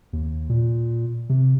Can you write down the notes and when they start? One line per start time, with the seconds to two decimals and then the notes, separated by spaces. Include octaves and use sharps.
0.13 D#2
0.49 A#2
1.29 C3